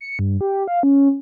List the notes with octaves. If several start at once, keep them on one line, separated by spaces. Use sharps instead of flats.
C#7
G2
G4
F5
C#4